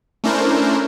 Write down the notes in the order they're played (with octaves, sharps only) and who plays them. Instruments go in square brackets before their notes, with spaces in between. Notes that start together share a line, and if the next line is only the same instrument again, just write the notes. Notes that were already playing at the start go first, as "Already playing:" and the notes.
[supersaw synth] A3 C#4 D4 E4 A#4 C5